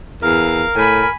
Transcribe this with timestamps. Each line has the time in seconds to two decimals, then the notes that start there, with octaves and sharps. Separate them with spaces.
0.22 E2 A#4 F5
0.76 A2 G#5 B5